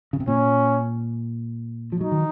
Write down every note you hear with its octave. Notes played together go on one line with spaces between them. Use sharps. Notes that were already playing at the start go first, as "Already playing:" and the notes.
C#3
C3
A#2 C#4
F3
F#3 D#4
D#3